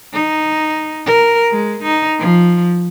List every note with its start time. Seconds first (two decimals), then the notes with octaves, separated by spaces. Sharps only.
0.14 D#4
1.06 A#4
1.52 G#3
1.83 D#4
2.19 F3